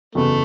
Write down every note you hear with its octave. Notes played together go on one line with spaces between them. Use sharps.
F#1 E2 C#3 F#3 A3 B3